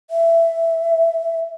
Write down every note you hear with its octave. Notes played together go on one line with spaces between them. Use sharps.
E5